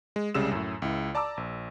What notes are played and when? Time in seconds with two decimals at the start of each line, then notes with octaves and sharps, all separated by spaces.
0.16 G#3
0.34 C2 C#3 G3 G#3 E6 E7
0.51 F#2 A2
0.82 C#2 E4
1.15 D5 A5 A#5 D6 E6
1.37 A#1